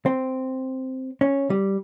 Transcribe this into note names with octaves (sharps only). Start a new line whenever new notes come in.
C4
C#4
G3